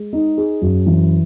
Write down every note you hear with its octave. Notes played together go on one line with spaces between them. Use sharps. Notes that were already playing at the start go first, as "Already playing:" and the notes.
Already playing: G#3
D#4
G#4
F#2
E3